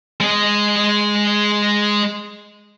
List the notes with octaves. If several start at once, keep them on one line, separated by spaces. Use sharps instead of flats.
G#3 D#5